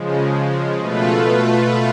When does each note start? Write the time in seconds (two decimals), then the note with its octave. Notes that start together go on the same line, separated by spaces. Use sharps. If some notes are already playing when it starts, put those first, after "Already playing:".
Already playing: C#3 F3 G#3
0.79 B2 A3 F4 B4